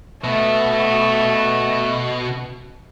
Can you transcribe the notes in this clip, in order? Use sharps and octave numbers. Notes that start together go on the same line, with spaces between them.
B2 A3